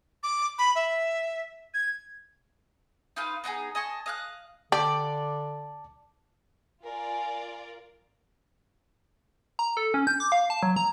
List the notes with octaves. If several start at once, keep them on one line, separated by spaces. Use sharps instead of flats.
D6
B5
E5
G#6
D#4 F4 B4 F5
B3 D#4 G4 G#4
D#5 G#5 A5 C#6
D#5 F5 F#6
D3 G4 D5 A5
F4 A#4 D5 G#5
A#5
A4
C#4
G6
D6
F5
A5
F#3
A#5